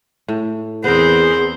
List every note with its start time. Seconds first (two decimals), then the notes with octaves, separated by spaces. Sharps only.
0.28 A2
0.84 E2 B3 C4 G#4 A#4 C5